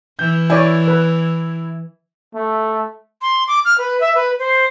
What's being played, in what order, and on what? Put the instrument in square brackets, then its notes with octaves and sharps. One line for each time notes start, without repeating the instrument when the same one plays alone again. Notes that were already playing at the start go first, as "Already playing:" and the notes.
[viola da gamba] E3 [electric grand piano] G6
[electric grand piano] E4 [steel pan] C#5 D5 G#5
[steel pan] B4
[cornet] A3
[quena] C6
D6
F6
B4
E5
B4
C5